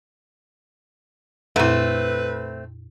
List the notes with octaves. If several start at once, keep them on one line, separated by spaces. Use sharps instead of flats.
F2 A#2 A3 C4 E4 B4